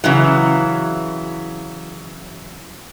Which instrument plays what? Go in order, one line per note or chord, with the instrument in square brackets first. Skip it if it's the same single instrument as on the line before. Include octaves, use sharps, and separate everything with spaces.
[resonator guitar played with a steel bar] C#3 E3 F#3